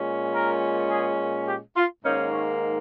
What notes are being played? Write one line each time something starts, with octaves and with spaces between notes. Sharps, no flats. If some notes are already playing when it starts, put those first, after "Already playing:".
Already playing: A#2 G#3 C#4
A#4
G#4
G4
F4
G#2 D#3 A#3 C#4 D#4
C#4